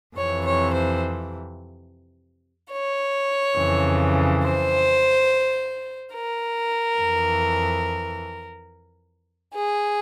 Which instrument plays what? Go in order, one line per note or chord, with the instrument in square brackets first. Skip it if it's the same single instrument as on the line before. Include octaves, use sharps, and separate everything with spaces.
[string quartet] F2 C3 E3 C#5
C#5
C5
C#5
F2 C#3 E3
C5
A#4
F2 E3
G#4